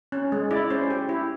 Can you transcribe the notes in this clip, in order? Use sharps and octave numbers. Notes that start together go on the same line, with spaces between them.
C#4
G#3
E4 D5
C#4 C5
G4
E4